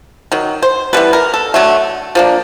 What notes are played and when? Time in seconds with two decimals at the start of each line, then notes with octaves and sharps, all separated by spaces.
0.32 D#3 F#3
0.62 C5
0.93 E3 G3 B3 B4
1.13 A#4
1.34 A4
1.54 D3 F#3 A3
2.15 F3 A#3 D4